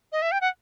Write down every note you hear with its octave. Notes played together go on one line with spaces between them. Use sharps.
D#5
E5
G5
F#5